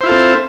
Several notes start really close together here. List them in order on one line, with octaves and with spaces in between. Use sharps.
C5 E4 F4 A4 C4